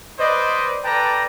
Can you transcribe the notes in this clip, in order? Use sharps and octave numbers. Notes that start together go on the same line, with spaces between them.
B4 C5 D5 D#5
A4 B4 D5 G5 A5 A#5